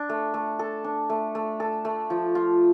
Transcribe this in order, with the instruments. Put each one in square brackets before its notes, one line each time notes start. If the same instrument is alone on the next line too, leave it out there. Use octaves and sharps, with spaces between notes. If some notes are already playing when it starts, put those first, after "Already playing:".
Already playing: [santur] D4
A3
A3
A4
D4
A3
A3
A4
A3
F3
F4